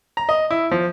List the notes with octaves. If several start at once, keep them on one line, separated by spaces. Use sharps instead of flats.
A#5
D#5
E4
F3